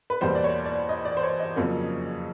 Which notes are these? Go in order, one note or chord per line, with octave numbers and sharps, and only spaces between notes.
B4
E2 B2 G3 A#3 C5
D5
C#5
D5
D#5
D5
C5
C#5
D#5
F2 C#3 F#3 A#3 C#4